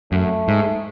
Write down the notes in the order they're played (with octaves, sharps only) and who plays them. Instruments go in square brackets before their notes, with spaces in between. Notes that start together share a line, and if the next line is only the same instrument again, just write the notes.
[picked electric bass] F#2 [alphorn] A3
[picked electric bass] G#2